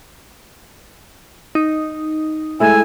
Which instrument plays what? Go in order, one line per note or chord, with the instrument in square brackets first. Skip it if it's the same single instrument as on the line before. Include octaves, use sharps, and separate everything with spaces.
[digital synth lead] D#4
[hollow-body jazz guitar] G#3 A3 E4 [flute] G#5